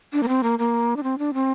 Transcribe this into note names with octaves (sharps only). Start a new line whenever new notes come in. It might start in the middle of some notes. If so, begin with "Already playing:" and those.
D4
A#3
C4
A#3
A#3
D4
C4
D4
C4